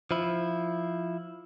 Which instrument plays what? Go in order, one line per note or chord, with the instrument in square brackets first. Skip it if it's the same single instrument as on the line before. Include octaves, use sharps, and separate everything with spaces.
[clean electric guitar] F3 E4